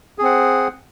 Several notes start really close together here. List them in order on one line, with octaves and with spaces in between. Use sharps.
G#4 C4 F#5